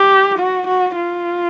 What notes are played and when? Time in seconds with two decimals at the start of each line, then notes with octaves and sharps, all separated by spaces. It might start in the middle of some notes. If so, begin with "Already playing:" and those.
Already playing: G4
0.39 F#4
0.68 F#4
0.97 F4